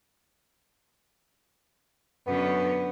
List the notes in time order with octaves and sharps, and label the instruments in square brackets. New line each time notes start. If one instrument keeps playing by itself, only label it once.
[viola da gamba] F#2 D3 C#4 [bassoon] B3